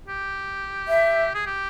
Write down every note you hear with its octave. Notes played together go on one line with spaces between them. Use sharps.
G4
E5
G#4
G4